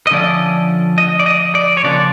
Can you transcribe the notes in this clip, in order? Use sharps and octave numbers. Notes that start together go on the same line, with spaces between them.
D#5
D3 F3 A3 C#4 D5
D#5
D5
D#5
D5
C#5
C#3 F3 A#3 D4 D5